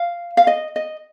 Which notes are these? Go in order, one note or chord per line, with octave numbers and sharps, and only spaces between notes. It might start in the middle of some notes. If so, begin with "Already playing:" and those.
Already playing: F5
F5
D#5
D#5